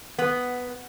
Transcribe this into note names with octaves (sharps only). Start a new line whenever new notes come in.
B3